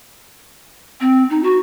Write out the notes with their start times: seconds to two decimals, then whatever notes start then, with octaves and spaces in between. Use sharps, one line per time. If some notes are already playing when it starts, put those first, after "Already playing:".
1.01 C4
1.30 D#4
1.43 F#4